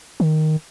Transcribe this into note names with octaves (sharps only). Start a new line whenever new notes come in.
D#3